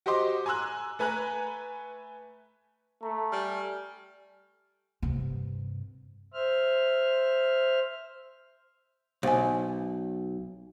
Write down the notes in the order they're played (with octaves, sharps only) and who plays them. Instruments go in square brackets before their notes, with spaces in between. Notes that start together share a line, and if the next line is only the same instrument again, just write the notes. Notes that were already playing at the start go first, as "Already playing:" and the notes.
[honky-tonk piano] F#4 G4 C5 D#5 C6 D6
G#5 A#5 C6 E6 F#6
A3 B4 G#5 A#5 F#6
[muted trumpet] A3 [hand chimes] A#5
[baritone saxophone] G3 [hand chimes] G#5 F6
[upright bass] G2 C3
[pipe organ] C5 E5 F6
[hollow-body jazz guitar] B1 [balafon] C5 G#5